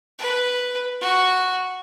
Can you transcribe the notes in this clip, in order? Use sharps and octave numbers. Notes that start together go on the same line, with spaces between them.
B4
F#4